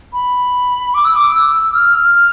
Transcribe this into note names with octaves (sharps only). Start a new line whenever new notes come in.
B5
D6
E6
D6
E6
F6
F6